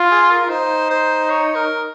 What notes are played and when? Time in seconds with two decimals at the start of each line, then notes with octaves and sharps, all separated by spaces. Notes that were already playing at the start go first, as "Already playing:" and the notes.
Already playing: F4
0.11 G#4
0.30 A#4
0.50 D#4 C5
0.90 C5
1.30 C#5
1.55 A#4